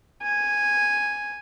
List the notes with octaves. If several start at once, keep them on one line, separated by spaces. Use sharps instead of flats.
G#5